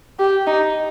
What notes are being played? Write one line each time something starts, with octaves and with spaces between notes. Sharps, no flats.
G4
D#4